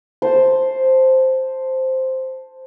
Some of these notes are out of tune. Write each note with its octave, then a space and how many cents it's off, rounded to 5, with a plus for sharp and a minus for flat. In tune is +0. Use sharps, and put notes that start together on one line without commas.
C5 +0 A5 +0